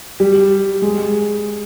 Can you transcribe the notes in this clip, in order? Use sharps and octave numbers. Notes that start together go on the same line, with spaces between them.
G3
G#3